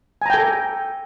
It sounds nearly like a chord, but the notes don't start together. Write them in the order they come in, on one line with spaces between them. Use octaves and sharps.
G#5 A#5 G5 A4